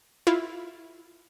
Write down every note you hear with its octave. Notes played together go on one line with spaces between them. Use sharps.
E4 F4